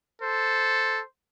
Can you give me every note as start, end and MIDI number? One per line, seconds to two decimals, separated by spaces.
0.22 1.01 69
0.22 1.02 72